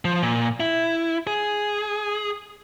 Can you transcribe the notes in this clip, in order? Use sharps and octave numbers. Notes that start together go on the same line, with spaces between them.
F3
A#2
E4
G#4